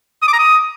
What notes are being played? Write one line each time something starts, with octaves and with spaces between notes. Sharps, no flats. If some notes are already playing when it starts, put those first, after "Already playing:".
D#6
D6
A#5
D#6